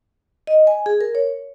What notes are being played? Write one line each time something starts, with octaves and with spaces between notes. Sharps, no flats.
D#5
G#5
G#4
A#4
C#5